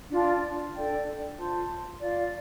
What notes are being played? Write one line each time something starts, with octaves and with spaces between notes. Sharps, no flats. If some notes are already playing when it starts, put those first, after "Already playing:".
D4 F4 D5 A5
D4 A4 D5 G5
F4 C5 A5 C6
F4 D5 F5